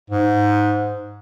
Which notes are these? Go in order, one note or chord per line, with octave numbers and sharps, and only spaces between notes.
G#2